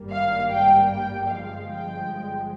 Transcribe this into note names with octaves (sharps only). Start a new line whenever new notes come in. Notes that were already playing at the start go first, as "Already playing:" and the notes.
Already playing: G#1 G2 G3 A#3
F5
G5
G5
G1 G2 F3 G#3 F5
G5